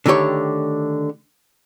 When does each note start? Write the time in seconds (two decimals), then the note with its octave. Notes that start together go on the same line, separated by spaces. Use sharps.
0.06 D3 D#3 A3 G4 C#5